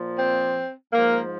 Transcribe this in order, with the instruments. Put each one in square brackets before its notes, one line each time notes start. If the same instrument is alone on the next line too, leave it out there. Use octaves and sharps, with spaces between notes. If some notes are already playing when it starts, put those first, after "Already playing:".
Already playing: [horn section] A#2 F3
C4
G#2 F3 A#3